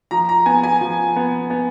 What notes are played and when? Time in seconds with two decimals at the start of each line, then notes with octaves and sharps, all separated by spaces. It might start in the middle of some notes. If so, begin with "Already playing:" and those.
0.11 F3 A#5
0.29 A#5
0.46 B3 G#5
0.64 G#5
0.81 F3
1.16 B3
1.50 B3